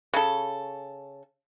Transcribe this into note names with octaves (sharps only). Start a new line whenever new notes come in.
C#3 A4